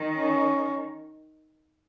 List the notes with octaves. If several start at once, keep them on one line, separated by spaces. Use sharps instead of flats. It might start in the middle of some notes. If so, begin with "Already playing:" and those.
Already playing: D#3
C#4